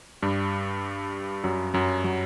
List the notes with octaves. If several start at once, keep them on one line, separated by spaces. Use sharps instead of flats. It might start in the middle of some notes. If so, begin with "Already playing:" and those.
G2 G3
F#2 F#3
F#2 F#3
F#3